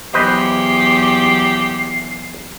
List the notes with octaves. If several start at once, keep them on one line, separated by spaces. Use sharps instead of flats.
E2 F#3 G4 B4 C5 D#5 C7